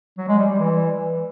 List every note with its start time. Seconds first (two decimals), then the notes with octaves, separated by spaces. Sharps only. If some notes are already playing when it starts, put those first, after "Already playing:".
0.18 F#3
0.28 G#3
0.39 G3
0.49 G3
0.59 E3